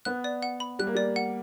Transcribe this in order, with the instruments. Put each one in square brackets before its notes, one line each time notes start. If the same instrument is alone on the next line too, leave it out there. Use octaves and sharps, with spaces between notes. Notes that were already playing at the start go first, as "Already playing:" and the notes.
[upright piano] B3 [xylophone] F#6
[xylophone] D5
F#5
B5
[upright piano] G3 [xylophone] F#6
[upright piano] A#3
[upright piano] G3 [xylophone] D5
[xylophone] F#5